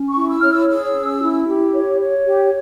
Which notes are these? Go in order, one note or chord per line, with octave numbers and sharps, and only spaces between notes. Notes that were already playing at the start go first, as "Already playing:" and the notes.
Already playing: C#4
C#6
E4
E6
C#5 F6
E6
G#4 E6
C#4
E4
G4
C#5
C#5
G4